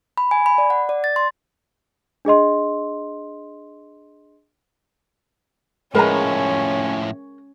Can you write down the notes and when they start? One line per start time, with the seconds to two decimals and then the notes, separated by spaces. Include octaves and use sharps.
0.17 B5
0.31 G#5
0.46 B5
0.58 D5
0.70 F#5
0.89 D5
1.04 A6
1.16 C6
2.25 D4 G#4 D#5 C6
5.95 A2 F3 G#3 C#4 A#4 B4 F5 A#5